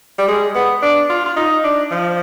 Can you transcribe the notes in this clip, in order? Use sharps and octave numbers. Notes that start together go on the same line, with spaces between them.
G3
G#3
B3
D4
F4
F4
D#4
D4
F3